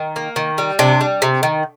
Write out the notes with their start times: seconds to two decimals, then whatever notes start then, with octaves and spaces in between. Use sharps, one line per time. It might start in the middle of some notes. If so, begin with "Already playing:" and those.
Already playing: D#3
0.16 A#3
0.36 D#3
0.58 G3
0.79 C3 D4
1.01 G3
1.22 C3
1.43 D#3